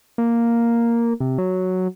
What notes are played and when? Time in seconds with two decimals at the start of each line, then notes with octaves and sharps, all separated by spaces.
0.18 A#3
1.20 C3
1.38 F#3